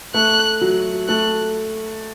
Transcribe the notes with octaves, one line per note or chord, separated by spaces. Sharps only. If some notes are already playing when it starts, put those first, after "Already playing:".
A3 F#6
F#3
A3 F#6